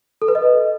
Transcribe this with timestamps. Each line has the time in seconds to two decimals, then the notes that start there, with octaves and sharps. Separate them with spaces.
0.22 A4
0.28 B4
0.35 D#5